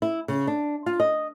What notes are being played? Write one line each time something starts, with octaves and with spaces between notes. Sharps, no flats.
E4
C#3
D4
F4
D#5